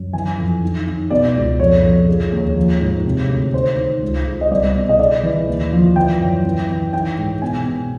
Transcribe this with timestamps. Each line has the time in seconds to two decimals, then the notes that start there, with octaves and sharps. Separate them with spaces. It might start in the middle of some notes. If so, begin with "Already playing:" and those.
Already playing: F#2
0.13 E3 G#5
0.38 F2
0.63 D#3
0.87 D#3
1.10 B2 D5
1.36 C#2
1.60 F2 C#5
1.84 F2
2.08 C#3
2.32 D#2
2.57 F3
2.81 G#2
3.05 C3
3.29 D2
3.54 D#3 C5
3.79 D#3
4.02 C#2
4.26 C#2
4.41 D#5
4.51 C2 D5
4.76 B2
4.89 D#5
4.99 C#3 D5
5.23 E3
5.48 D#2
5.72 F3
5.96 E3 G5
6.20 F#2
6.45 E3
6.69 E3
6.93 D#3 G5
7.18 G#2
7.42 B2 G#5
7.66 B2